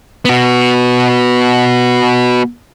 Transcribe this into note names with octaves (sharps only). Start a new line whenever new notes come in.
B3 F#4